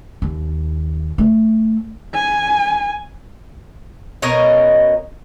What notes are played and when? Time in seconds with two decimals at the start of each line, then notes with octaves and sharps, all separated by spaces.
0.22 D#2
1.18 A3
2.15 G#5
4.22 B2 C#4 A#4 D#5